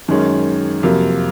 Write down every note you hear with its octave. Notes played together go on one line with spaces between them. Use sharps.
F#2 D#3 G#3 C#4
F2 C3 F#3 A#3